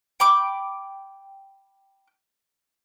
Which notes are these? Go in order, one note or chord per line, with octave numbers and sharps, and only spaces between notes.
G5 B5 D6